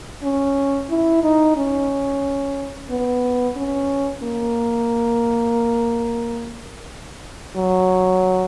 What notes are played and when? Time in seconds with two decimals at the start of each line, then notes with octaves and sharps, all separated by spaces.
0.23 C#4
0.90 E4
1.23 D#4
1.57 C#4
2.90 B3
3.57 C#4
4.23 A#3
7.56 F#3